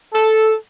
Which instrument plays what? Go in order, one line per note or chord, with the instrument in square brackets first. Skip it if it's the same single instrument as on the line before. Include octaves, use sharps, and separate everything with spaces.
[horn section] A4